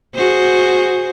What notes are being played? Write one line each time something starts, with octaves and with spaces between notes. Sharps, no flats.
F#4 G#4 C5